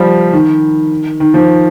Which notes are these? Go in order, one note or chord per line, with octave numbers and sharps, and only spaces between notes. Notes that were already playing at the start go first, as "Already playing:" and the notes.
Already playing: F3 G3
D#3
D#3
F3